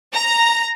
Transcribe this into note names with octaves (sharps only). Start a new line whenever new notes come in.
A#5